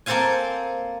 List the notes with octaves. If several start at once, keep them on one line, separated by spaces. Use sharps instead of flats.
A#3 C4 A4 C5 F5 G#5